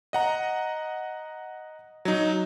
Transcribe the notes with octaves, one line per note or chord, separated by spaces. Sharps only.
D#5 F#5 A#5
F#3 D#4